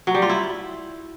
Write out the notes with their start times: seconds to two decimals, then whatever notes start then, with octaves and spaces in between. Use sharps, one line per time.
0.07 F#3
0.15 G3
0.22 F4
0.29 E4